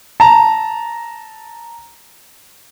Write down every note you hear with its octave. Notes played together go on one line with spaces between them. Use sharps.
A5 A#5